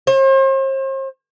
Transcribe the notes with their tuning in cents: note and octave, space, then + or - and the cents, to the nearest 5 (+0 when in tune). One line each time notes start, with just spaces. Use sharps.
C5 +40